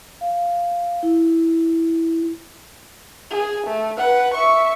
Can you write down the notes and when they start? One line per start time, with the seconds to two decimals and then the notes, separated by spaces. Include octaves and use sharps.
0.21 F5
1.03 E4
3.30 G#4
3.67 A3
3.97 B4 F#5
4.34 E5 C#6